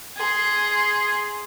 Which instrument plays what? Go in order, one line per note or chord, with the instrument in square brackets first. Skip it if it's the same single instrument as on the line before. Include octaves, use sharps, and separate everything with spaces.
[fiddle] G#4 C6